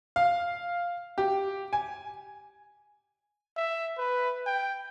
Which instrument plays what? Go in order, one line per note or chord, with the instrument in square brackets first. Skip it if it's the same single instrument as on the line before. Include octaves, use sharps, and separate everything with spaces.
[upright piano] F5
G4
G#5
[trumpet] E5
B4
G5